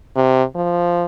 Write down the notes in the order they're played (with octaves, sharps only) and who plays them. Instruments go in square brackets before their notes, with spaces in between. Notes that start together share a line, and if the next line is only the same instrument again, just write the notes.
[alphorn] C3
F3